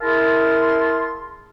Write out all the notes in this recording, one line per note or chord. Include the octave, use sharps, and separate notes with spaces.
E4 G#4 A#4 F5 A5 C6